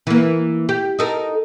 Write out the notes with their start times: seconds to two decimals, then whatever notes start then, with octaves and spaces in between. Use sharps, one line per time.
0.07 E3 A#3
0.69 G4
0.99 D#4 A4 A#4